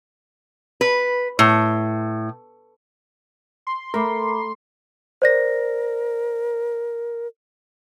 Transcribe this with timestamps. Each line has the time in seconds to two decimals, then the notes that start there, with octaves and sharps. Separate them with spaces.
0.81 B4
1.39 A2
3.67 C6
3.94 A3 A#4 A#5 B5 D6
5.22 A#4 C5 D5 A#6